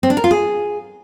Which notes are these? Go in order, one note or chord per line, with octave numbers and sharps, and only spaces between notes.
C4
D4
A#4
F4
G#4